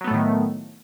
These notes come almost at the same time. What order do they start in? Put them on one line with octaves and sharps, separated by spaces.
F#3 B3 A3 A2 D#3